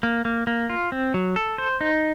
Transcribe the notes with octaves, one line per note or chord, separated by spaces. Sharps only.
A#3
A#3
A#3
F4
C4
F#3
A4
C5
D#4